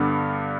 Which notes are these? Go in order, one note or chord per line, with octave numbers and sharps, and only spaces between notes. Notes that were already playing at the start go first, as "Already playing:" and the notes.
Already playing: G2 D3 G3 B3